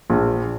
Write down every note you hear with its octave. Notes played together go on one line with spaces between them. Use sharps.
A#1